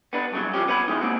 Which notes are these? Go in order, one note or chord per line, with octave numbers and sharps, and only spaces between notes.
B3 D4 B4
G2 C#3 F#3
F3 C#4 G4
B3 C#5 B5
E3 G#3 D#4
A#3 C4 F#4